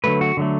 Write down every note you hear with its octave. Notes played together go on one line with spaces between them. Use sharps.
D3 F#3 A3 B4
F#4
D3 F#3 A3